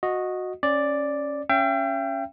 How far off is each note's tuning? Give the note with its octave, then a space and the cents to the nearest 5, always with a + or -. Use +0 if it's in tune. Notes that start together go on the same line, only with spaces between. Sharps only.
F#4 -15 D#5 +0
C#4 -10 D5 +0
C#4 +0 E5 +45 G5 +0